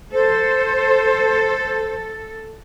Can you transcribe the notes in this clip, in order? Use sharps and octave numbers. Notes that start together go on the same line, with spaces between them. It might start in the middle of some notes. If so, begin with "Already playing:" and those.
A4 C5